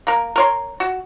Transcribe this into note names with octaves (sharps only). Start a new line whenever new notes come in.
A#3 A#4
A#4 C#5 C6
F#4